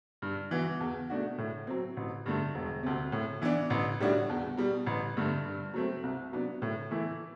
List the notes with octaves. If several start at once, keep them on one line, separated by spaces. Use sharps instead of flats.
G2
E3 B3 F#4
E2
B2 A3 D4 F#4
A2
F#3 C4
A1
G2 D3 A3
E1
D2 C3
A2
E3 B3 D4
A1
A2 G3 D4 F#4
E2
B2 G3
A1
G2 D3 A3
G2
F#3 A3 C4
C2
C3 F#3 B3 D4
A2
E3 A3 E4